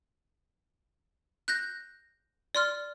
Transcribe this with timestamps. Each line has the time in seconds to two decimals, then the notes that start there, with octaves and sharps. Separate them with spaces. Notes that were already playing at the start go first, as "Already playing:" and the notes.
1.48 F#6 G6 A#6
2.55 D5 C6 F6